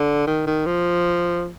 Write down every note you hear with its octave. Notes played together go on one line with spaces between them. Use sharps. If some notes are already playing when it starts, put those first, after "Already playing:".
Already playing: D3
D#3
D#3
F3